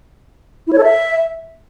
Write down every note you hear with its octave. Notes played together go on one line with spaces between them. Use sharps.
E4
C#5
A4
E5